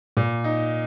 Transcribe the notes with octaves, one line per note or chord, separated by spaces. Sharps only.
A#2
D#4